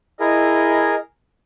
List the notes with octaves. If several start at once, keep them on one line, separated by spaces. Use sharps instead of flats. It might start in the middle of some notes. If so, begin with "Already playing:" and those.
E4 G#4 A#4 D#5